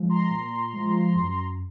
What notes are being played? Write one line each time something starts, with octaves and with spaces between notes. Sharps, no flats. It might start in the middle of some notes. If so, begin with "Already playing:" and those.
Already playing: F3 G#3
A#5 C6
A#2
F3 G#3
F#2